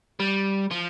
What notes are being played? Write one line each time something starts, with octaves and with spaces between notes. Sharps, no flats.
G3
F3